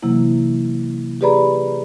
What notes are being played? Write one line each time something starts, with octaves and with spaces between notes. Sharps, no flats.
C3 E3 F#3 A#3 E4
G4 G#4 B4 D5 A#5 B5